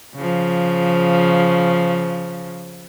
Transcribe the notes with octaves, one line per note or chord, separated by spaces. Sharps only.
C#3 F3